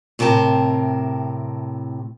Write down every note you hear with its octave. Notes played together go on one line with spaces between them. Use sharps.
A2 C3 A#4 G5 A5